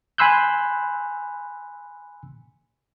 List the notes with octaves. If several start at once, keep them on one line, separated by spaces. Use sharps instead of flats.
G#5 B5 C6 E6 F#6 G6